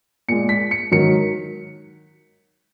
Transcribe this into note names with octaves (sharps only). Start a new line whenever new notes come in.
A#2 G#3 C#7
B6
C#7
G#2 D#3 F#3 C#7